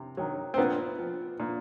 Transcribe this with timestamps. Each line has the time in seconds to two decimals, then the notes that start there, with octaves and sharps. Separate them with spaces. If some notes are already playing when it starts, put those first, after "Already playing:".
Already playing: C3
0.17 D#3 F#3
0.54 C4
0.58 A#2 B3
0.99 F3
1.40 A#2